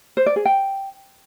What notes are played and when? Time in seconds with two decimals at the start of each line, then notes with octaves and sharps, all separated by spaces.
0.17 C5
0.26 D5
0.36 G#4
0.45 G5